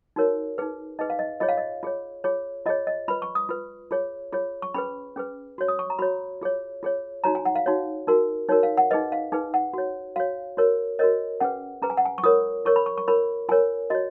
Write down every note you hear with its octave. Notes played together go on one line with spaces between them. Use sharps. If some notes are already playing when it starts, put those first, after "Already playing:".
D#4 F#4 A#4 C#5
D#4 G#4 B4
D#4 G#4 B4 D#5
F5
D#5
F4 G#4 C#5 D#5
F5
D#5
F4 G#4 C#5
F4 G#4 C#5
F4 G#4 C#5 D#5
D#5
F4 B4 B5
C#6
D#6
F4 B4
F4 G#4 C#5
F4 G#4 C#5
C#6
C#4 G#4 B4 B5
C#4 G#4 B4
F#4 C#5
D#6
C#6
A#5
F#4 C#5 B5
F4 G#4 C#5
F4 G#4 C#5
D#4 F#4 C#5 A#5
G#5
F#5
F5
D#4 F#4 C#5
D#4 F#4 A#4
D#4 F#4 A#4 C#5
F5
F#5
D#4 G#4 B4 D#5
F5
D#4 G#4 B4 G#5
F#5
F#4 C#5
F#4 C#5 F5
F#4 A#4 C#5
F#4 A#4 C#5 D#5
C#4 G#4 B4 F#5
C#4 G#4 B4 A#5
G#5
F#5
G#5
C#6
F4 A#4 C#5 D#6
F4 A#4 C#5 C#6
B5
C#6
C#6
F4 A#4 C#5 B5
F4 A#4 C#5 G#5
F#4 C#5 D#5